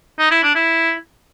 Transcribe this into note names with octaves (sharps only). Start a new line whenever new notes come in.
D#4
E4
D4
E4